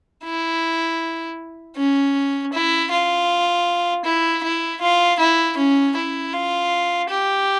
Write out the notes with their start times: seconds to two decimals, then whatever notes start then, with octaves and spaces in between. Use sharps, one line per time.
0.24 E4
1.76 C#4
2.53 E4
2.91 F4
4.05 E4
4.43 E4
4.81 F4
5.19 E4
5.57 C#4
5.96 E4
6.33 F4
7.09 G4